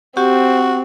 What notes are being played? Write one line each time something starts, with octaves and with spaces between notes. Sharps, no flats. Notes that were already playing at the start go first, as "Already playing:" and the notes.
C4 F#4 G4